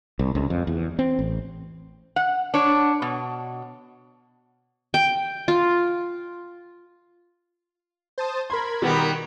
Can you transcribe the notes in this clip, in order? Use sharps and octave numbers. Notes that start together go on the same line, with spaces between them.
C2
C#2
F2
E2
C4
A1
F#5
D4 C#5
B2
G5
F4
C5 A5 D#6
A#4 B5 C6 G#6
B2 D#3 G3 B3